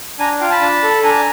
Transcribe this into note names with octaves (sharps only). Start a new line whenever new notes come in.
D4 G#5 A#5
F4 F5 G5
A5 B5
D4
A4
D4 G#5 A#5